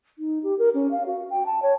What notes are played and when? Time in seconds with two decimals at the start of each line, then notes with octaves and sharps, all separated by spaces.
0.19 D#4
0.43 G4
0.59 A#4
0.74 C#4
0.91 F5
1.06 F#4
1.30 G5
1.46 A5
1.63 C#5